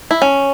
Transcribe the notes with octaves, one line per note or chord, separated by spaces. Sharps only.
E4
C#4